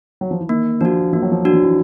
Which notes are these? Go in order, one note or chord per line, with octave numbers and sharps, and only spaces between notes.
F#3
F3
E3
D#3 A#3
F3 D4 F#4
F3 A#3
F#3
F3
F#3 D4 F#4
F3
E3